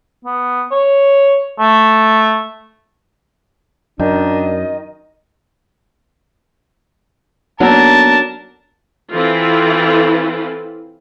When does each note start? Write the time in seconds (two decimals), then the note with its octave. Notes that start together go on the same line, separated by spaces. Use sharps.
0.25 B3
0.71 C#5
1.60 A3
3.99 F#2 D#3 D4 D#5
7.60 F#3 A#3 B3 D4 D#4 A4 A#4 A5
9.12 E3 C4 E4 F4 A4